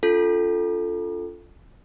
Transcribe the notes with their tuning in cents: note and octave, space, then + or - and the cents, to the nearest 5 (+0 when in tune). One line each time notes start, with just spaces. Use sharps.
C#4 +45 F4 +0 A4 +0